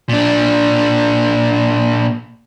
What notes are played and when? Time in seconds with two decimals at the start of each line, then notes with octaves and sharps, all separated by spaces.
0.09 A#2 D4